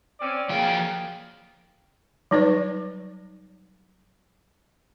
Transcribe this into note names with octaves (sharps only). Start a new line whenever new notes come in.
C4 C#4 D5
F3 F#3 A#3 G#4 G5
F#3 G3 D#4 B4 C#5 D5